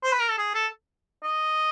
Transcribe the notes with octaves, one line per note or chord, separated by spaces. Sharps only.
C5
B4
A#4
A4
G#4
A4
D#5